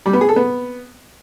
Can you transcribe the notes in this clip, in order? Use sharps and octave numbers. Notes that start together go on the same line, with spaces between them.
G3
B3
G#4
A4
B3